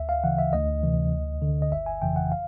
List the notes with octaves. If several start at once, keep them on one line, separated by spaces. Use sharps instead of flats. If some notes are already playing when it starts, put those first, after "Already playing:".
Already playing: D2 E5
F5
C#3 E3 F#5
E5
D2 D#5
C3 E3
D2
D3
D#5
G1 E5
G#5
F2 C#3 E3 G5
F#5
F5